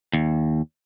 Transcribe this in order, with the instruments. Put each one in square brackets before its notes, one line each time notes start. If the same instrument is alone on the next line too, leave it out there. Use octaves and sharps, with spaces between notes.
[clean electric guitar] D#2